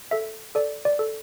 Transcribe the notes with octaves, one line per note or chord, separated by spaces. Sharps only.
A4 E5
A4 D5
D5
A4